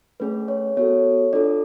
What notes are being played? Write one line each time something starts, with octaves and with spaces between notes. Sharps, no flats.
A3 C#4 G#4 B4
C#5
B3 F#4 A4 C#5
D4 F4 A4 D5